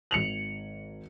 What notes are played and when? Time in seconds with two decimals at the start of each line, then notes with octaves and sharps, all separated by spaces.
0.11 G#1 C#7 F7 F#7